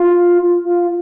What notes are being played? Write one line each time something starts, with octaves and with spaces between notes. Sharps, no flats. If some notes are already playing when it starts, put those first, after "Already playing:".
Already playing: F4
F4